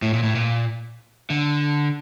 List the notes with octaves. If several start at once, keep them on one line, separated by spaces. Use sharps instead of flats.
A2
A#2
A2
A#2
D3